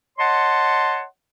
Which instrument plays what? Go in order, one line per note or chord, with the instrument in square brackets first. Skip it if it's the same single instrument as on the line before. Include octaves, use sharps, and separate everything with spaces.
[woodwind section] C#5 D#5 F#5 A5 C6